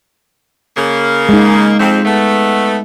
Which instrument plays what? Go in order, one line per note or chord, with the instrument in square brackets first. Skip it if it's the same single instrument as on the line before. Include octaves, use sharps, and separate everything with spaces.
[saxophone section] C#3 A#3
[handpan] G#3 D#4
[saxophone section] F2 C4
A3 B3